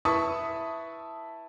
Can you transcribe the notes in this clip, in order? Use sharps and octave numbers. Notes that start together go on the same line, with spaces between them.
E4 B4 E5 A5 C#6 D#6